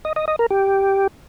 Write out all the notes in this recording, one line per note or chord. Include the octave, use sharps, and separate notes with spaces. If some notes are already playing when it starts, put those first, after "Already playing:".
D#5
D#5
D#5
A#4
G4